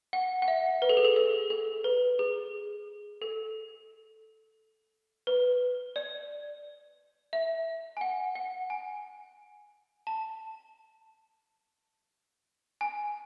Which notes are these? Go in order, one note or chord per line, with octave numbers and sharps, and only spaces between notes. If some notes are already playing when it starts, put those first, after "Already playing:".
F#5
F#5
E5
B4
A4
G#4
A4
A4
A4
B4
G#4
A4
B4
D5
E5
G#5
F#5
F#5
G#5
A5
G#5